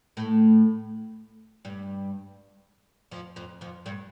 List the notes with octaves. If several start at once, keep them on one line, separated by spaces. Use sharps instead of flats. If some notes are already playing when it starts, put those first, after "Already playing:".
A2 A3
G2 G3
F2 F3
F2 F3
F2 F3
G2 G3